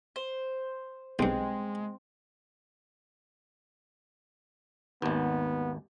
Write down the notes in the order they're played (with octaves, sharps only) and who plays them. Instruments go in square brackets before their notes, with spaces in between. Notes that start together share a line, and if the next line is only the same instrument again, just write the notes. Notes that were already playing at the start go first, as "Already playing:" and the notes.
[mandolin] C5
[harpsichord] B1 G2 [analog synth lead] G#3 [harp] C4
[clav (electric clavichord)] G#1 D#2 [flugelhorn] B3